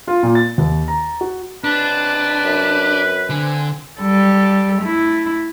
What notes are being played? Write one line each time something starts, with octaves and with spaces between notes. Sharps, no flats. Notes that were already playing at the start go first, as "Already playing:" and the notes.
F4
A#2
A6
D#2
A#5
F#4
C#2 C3 D4 B4 A5
F#2
D3 C4 C5 G#5
G3 A4
A3 E4